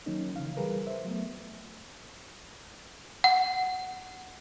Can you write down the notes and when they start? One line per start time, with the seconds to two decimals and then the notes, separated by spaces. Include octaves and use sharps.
0.06 D#3 F#3 A#3 C#4 D#4
0.36 C#3 E3 F3 F5
0.57 E3 G3 G#4 A#4 B4
0.87 C5 E5
1.05 F#3 A3 B3
3.24 F#5